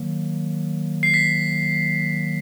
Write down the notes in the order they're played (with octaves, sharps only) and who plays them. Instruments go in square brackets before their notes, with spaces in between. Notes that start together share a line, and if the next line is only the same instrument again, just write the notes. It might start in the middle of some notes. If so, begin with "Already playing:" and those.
Already playing: [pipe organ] D#3 F#3 A#3
[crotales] C7
B6